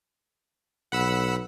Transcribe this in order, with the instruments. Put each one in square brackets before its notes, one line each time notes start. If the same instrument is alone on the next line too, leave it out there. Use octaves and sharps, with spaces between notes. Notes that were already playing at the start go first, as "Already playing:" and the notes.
[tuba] B1 [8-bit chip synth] F#5 B5 E6